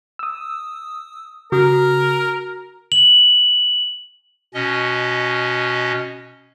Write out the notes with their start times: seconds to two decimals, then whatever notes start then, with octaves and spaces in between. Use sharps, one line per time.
0.19 D#6 E6
1.52 C#3 F#4 A#4 D#6
2.92 F#7
4.54 B2 C#4 D#5